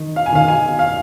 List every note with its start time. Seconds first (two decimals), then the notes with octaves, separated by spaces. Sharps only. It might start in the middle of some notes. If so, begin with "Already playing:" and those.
Already playing: D#3
0.16 F5
0.26 G#5
0.32 D#3 F5
0.48 G#5
0.79 F5